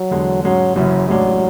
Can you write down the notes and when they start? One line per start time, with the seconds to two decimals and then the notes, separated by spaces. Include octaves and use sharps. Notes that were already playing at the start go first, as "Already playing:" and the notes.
Already playing: F#3
0.11 E2 D3 G#3
0.43 G#2 F#3 G#3 C#4
0.75 F#1 F#2 C#3 E3 F#3
1.08 A1 A2 F#3 G#3 D4